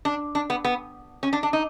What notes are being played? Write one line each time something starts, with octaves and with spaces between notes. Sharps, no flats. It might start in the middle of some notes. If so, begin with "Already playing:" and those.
D4
D4
B3
B3
C#4
D4
D4
D#4